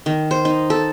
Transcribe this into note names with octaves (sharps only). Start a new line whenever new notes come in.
D#3
C5
D#4
A4